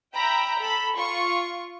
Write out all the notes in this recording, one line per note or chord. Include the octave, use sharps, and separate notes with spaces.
E5 G5 A#5 B5
A4 B5
F4 C#6